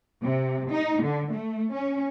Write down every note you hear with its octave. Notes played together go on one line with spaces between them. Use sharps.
C3
D#4
D3
A3
C#4